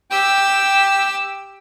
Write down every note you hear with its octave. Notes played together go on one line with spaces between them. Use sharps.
G4 G5 E6